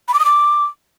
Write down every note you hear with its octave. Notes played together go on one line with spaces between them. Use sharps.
B5
D6
D#6
D6